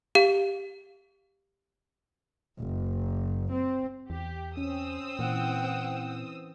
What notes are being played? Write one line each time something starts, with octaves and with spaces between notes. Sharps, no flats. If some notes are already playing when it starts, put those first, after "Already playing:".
G4 F5
F#1
C4
E2 G4
C4 C#4 D#6 E6
A#2 E3 F#5 G5